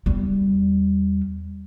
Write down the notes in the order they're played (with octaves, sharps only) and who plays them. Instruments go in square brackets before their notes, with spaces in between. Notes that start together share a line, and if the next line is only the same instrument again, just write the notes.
[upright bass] E2 G3